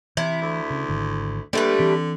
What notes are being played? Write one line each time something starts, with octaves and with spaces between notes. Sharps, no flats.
C3 E3 E4
D2
C#3
G#1 D3
D3 G3 A3 A#3 B4
E3 C4